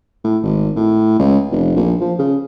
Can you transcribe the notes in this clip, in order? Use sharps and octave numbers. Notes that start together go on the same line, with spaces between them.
A2
G#1
A2
C#2
F1
A#1
F3
C#3